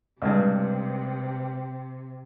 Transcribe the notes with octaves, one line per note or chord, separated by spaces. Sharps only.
C#2 G2 C3